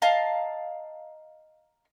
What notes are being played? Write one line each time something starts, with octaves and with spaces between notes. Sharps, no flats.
D#5 F5 A5 A#5